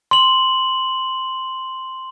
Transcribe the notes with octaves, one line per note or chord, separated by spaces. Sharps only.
C6 F#7